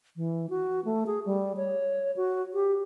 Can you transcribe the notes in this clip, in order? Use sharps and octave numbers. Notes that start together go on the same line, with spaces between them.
E3
F#4
A3
G#4
G3
C#5
F#4
G4